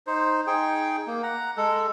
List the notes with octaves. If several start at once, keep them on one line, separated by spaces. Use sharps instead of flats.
D#4 C5
D#4 G#4 G5
A#3
F#5 A#5
G#3 A4